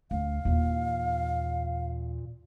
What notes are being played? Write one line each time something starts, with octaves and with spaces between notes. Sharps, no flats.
D2 F5
D#2 A#2 E3